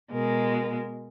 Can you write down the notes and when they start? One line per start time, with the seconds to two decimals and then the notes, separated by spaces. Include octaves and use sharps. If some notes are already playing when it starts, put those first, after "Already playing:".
0.13 B2 G#3 A#4